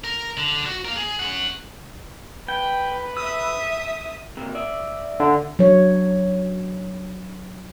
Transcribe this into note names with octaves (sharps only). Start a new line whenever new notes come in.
A#4
D3
F#4
A#4 F5
G#4
C#4 F#5
B4 G5
E5 D#6 E6
C3 A#3
D5 E5
D3
F#3 D4 C#5